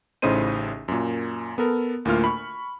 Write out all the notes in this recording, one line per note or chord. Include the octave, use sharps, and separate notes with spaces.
A1 A2 C#3 D#4 C5 D#7
F#2 A#2
B3 A4 A#4
D2 A2 A#3 F4 F6
B5 C#6